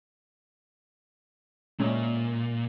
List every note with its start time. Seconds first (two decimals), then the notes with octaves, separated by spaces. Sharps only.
1.80 A#2 G#3 A3 C#4